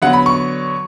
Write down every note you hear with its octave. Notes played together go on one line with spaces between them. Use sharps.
D3 F#3 B3 F#5
B5
C#6